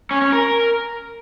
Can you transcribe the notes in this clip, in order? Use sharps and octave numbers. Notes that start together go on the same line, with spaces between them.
C#4
C#4
A#4